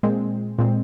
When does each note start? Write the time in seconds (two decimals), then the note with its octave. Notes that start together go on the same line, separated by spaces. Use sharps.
0.03 A#2 G#3 C4
0.59 A#2 G#3 C4